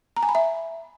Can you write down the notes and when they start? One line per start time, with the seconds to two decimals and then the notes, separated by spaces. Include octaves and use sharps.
0.16 A#5
0.23 G#5
0.29 B5
0.35 E5